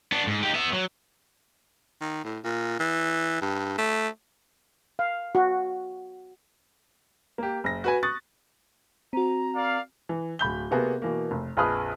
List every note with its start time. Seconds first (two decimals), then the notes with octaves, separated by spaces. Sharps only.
0.12 B3 D4
0.27 G#2
0.43 D#4 G4
0.54 B3 E5
0.73 F#3
2.01 D#3
2.25 A2
2.44 A#2
2.80 E3
3.42 G2
3.78 A3
4.99 F5
5.35 F#4
7.38 A#3 G4
7.64 F#1 A#6
7.84 F#4 B4 G#5
8.03 C#6 D#6 F#6 A6
9.13 C4 F#4 A#5
9.55 A#4 D5 F5
10.09 E3
10.39 D1 B5 G6 G7
10.71 C3 A#3 B3 F#4 G#4
11.02 B2 E3 A#3
11.31 F1
11.57 A#1 F2 G#4 B4 D#6 F6